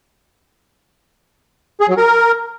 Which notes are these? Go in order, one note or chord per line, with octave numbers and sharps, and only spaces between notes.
G#4
F#3
A#4